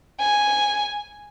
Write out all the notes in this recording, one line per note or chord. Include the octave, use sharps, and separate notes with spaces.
G#5